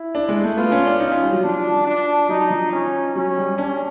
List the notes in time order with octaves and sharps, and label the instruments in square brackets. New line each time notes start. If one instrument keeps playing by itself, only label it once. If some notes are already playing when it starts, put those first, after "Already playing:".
Already playing: [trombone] E4
[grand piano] D4
G#3
A3
[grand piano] B3 [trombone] F4
[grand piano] C#4
D4
[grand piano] D#4 [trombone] F4
[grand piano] C#4
G3
F#3
[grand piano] F3 [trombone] D4
[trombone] D4
[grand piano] F#3 [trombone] D#4
[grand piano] F3
[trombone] C#4
[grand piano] F#3 [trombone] C#4
[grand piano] G3
[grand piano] C#4 [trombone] D4